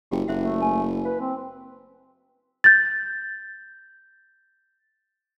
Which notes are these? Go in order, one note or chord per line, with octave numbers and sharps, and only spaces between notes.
F#1 G4 G5
F#1 C5 E5 F#5
A3
G#5
B4 F5
C4
G6 A6